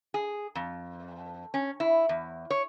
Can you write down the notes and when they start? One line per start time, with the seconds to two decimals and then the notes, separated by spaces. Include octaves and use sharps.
0.14 G#4
0.55 F2
1.54 C#4
1.80 E4
2.09 E2
2.50 C#5